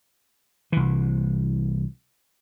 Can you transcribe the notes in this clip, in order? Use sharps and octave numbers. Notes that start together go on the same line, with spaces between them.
C2 E3